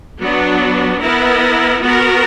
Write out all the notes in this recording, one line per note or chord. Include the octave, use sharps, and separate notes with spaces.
F#3 B3 D4
B3 E4 A#4
B3 F#4 A#4